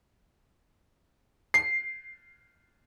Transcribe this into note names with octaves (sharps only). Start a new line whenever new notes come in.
C7